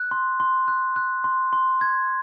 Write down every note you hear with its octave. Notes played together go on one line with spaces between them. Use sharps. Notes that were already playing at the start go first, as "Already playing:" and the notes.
Already playing: F#6
C6
C6
F#6
F#6
C6
C6
G#6